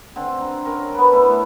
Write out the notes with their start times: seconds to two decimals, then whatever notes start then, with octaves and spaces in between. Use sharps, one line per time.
0.16 D3 C4
0.41 A#5
0.65 C#4 A#4
0.94 B3 B4
1.11 A3 E4
1.29 A3